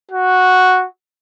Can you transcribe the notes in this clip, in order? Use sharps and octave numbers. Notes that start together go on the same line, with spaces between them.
F#4